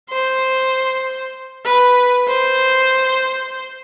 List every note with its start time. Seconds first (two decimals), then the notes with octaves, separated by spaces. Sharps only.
0.09 C5
1.65 B4
2.28 C5